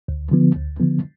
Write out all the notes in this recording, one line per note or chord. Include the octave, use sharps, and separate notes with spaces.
D2
D3 F3 B3
D2
D3 F3 B3